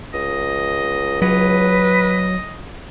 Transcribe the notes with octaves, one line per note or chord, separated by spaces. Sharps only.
C#2 D#5
F#3 B4 D#5